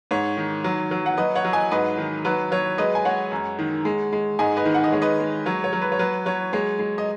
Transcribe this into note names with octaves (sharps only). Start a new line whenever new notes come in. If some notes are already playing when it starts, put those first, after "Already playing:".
G#2 C#5
D#3
F#3
F#3
F#5
F#3 B4 D#5
C#5 F#5
F#3
D#5 G#5
G#2 B4 D#5
D#3
F#3 B4
F#3 C#5
G#3 B4 D#5
G#5
G#3 C#5 F#5
F#2
D#3
G#3
G#3
G#2 D#5 G#5
B4 D#5
D#3
F#5
D#5
G#3 C#5
B4 D#5
G#3
F#3 C#5
C#5
F#3
B4
C#5
F#3 B4
F#3 C#5
G#3 C#5
G#3
D#5